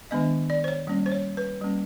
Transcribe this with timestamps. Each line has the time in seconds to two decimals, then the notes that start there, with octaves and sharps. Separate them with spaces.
0.11 D#3 G#3 B3 D4 D#5
0.50 D5
0.64 C5
0.68 C#5
0.87 G3 A#3 C#4
1.06 C5
1.12 C#5
1.37 B4
1.61 G3 A#3 C#4